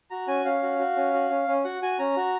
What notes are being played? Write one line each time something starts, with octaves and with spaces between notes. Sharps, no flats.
F#4 A#5
C#4 G#5
C#4 F5
F#4
F#4
C#4
F#4
C#4
C#4
F#4 F#5
F#4 G#5
C#4 A#5
F#4